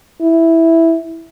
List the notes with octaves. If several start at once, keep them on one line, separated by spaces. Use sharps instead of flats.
E4